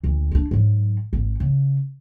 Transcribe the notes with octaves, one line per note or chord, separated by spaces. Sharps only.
D2 A#2
C#4 D4
G#2 F#3
G#1
C#3